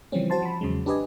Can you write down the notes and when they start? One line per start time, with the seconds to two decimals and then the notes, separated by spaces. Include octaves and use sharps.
0.12 C#3 E3 F3 G3 C4 C#4
0.30 F#4 C5 A5 C6
0.42 F3 B5
0.61 E2 C#3 F#3 G#3
0.86 D4 G4 B4 D5 D#5 G#5